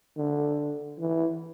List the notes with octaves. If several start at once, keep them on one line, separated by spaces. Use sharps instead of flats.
D3
E3